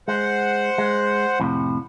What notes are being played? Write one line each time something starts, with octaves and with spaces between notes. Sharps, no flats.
G#3 C5 F#5
G#3
F2 A2 C3